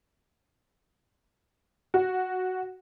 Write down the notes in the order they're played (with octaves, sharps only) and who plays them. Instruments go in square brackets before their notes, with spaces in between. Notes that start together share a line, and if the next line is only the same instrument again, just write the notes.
[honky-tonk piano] F#4